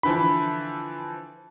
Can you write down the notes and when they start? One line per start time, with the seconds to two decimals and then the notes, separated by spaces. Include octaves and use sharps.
0.03 D3 E3 F3 B5